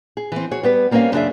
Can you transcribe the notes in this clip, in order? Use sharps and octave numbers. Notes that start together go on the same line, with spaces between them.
G#4
E3 C4
F#4 G#4 C#5
G3 B3 B4
G3 A#3 C4 C#4 A#4 F5
F#2 C#3 D4 G#4 E5